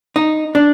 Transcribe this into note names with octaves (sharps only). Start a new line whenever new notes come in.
D#4
D4